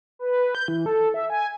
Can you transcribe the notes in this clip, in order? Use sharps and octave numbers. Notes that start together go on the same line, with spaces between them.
B4
B4
G6
E3
A4
E5
G#5